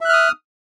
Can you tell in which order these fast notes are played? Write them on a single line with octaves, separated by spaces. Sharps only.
E5 F#6 F6 D#6